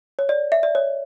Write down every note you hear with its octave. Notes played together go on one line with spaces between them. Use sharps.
C#5
D5
E5
D5
C#5